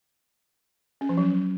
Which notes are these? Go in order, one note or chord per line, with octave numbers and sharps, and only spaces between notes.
C#4
F3
F#3